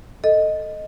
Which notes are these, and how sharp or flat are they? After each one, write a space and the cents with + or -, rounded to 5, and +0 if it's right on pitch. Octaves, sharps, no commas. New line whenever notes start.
A4 +0 D#5 +0